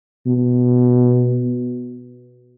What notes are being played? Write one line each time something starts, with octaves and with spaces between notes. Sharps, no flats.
B2